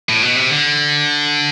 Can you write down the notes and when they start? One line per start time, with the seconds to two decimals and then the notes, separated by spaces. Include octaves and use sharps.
0.09 A2
0.23 B2
0.36 C3
0.49 D3